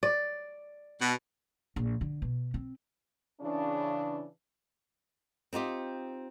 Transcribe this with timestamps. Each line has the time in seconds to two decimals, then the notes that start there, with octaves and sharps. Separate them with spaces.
0.03 D5
1.00 B2
1.76 A#1
2.01 D3
2.22 B2
2.54 C4
3.41 C#3 E3 D4
5.53 C4 D#4 F4 G4